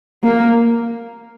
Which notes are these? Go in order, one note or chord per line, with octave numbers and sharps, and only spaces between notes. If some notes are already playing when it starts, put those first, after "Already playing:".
A#3